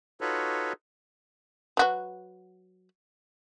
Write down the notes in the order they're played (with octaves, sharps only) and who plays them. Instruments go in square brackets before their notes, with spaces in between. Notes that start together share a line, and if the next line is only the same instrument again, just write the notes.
[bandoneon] D#4 F4 F#4 A4 B4 C#5
[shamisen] F#3 F#4 B4